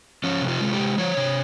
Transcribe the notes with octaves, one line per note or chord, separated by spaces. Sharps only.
F3 C#4
C3
F4
G#3
G4
C3
F3 C#5
C3